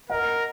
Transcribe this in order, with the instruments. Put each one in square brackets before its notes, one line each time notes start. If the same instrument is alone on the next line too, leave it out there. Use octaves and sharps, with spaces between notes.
[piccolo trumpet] A#4 [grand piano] D#5 F#5